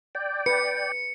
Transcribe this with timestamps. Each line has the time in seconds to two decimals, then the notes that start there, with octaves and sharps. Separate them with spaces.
0.15 D5 G5
0.46 B4 C#7